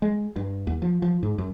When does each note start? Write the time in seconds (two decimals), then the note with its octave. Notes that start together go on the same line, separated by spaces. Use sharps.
0.02 G#3
0.36 G2
0.67 D#2
0.82 F3
1.02 F3
1.23 G#2
1.38 F#2